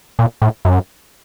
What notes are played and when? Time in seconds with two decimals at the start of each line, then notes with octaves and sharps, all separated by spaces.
0.19 A#2
0.42 A2
0.65 F#2